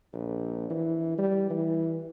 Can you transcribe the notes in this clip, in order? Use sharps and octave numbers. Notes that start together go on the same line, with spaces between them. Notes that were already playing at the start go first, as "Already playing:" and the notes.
A#1
E3
G3
E3